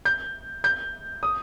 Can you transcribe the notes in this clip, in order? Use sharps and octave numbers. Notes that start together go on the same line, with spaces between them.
G6
G6
D#6